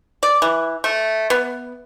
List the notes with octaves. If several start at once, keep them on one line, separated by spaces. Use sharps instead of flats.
D5
E3
A3
B3